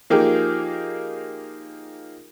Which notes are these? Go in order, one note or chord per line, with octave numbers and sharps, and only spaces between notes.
F3 A#3 D#4 G4 G#4 A#4